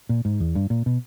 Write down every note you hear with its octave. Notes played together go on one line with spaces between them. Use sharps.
A#2
G#2
E2
G2
A#2
B2